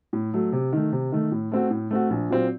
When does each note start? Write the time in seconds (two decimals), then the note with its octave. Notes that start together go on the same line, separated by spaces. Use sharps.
0.13 A2
0.34 F#3 A3
0.53 C3
0.73 D#3 A3
0.92 C3
1.12 D#3 A3
1.32 A2
1.52 A3 C4 F#4
1.71 A2
1.91 A3 C4 F#4
2.10 A#1
2.30 A#2 F#3 C4 F4